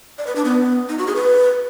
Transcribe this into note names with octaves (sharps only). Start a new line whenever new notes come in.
D5
B4
D4
B3
D#4
F#4
G#4
B4